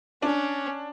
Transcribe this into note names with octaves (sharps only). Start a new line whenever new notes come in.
C#4 D4